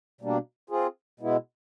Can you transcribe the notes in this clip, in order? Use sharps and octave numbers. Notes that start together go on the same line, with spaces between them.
B2 G3 A#3 D4
C4 F4 G#4
B2 G#3 B3 E4